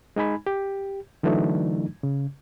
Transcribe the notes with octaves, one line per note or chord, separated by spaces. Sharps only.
G#3 D#4 G#5 B5
G4
D3 E3 F#3 A3 D4 D#4
C#3